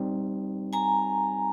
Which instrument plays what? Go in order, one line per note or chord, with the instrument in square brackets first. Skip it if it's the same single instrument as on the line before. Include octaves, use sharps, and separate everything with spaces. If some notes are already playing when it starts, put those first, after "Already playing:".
Already playing: [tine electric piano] G3 C4 D#4
[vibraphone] G#5 A#5